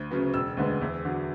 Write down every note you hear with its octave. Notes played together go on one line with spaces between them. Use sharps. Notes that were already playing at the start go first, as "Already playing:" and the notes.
Already playing: D2
C#3 F#3 B3
E1 E6
D2 D3 G#3 B3
E2
D3 F#3